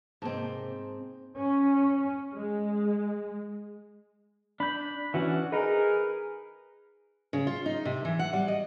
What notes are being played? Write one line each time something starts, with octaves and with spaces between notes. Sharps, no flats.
G#2 C3 A#3 C4 A5
C#4
G#3
D4 B5 G6
E3 C#4 D4 F#4
D#4 G#4 A#4 B4
C#3
F4
D#4
C3
E3
F#5
G3
D#5